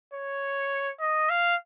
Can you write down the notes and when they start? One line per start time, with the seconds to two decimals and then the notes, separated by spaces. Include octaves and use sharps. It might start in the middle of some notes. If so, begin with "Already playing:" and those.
0.14 C#5
1.00 D#5
1.30 F5